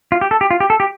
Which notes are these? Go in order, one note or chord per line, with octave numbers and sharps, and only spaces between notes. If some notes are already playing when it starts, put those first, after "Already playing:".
F4
G4
A4
G4
F4
G4
A4
G4